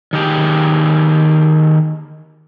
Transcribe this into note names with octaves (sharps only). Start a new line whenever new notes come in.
D#3 G4 G#4